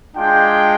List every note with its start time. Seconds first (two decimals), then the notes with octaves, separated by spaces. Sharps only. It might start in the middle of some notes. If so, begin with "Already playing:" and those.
0.15 G#3 D4 F4 G5